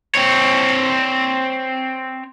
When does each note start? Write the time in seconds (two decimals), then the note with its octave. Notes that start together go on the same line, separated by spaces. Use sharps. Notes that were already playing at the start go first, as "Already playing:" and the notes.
0.15 C4 C#5